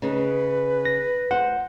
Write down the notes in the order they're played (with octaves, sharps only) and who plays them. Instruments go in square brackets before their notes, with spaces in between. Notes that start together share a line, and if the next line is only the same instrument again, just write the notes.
[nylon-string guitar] C#3 D#4 [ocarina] B4
[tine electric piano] A#6
[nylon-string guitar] C5 [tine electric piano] F#5